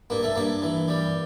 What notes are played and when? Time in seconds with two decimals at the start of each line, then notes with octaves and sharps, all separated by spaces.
0.10 G2 A#3
0.23 A3
0.36 G2 A#3
0.62 E3
0.88 G3